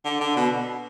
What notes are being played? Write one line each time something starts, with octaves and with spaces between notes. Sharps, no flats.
D3
D3
B2